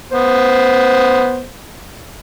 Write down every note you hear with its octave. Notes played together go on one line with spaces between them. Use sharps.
B3 C5